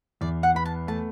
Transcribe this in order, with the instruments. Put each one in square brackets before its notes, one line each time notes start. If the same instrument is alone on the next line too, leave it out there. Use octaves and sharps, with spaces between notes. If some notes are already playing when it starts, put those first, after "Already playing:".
[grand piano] E2 [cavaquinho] D5
[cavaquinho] F#5
[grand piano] B3 [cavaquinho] B5
[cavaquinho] A5
[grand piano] A3 [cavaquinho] A5